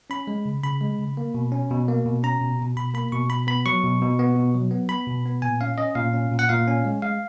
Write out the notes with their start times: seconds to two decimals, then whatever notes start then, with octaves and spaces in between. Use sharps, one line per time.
0.10 C#4 B5
0.27 G#3
0.46 C#3
0.63 C#3 B5
0.81 G#3
0.99 C#3
1.17 A#3
1.34 B2
1.52 C#4
1.71 B2
1.88 A#3
2.05 B2
2.23 C#4 A#5
2.41 B2
2.59 B2
2.76 B2 B5
2.94 A#3 B5
3.12 B2 C#6
3.30 B2 B5
3.47 B3 B5
3.66 F#3 C#6
3.84 B2
4.01 B2
4.19 B3
4.36 B2
4.55 F#3
4.71 B3
4.89 B3 B5
5.07 B2
5.25 B3
5.42 A#2 G#5
5.61 C#4 F5
5.78 C#4 D#5
5.95 A#2 F5
6.13 C#4
6.31 A#2
6.39 F#5
6.49 A#2 F5
6.67 C#4
6.85 G#3
7.02 G#3 F5